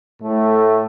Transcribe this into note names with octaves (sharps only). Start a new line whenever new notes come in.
A2 A3